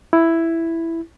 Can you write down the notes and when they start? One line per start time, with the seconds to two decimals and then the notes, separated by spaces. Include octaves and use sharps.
0.13 E4